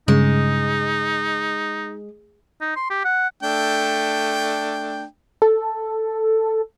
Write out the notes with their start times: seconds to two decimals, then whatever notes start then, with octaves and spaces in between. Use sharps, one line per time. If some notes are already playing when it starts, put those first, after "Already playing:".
0.08 G2 C#3 G#3 D#4
2.61 D#4
2.76 C6
2.90 G4
3.04 F#5
3.43 A3 D4 G5
5.42 A4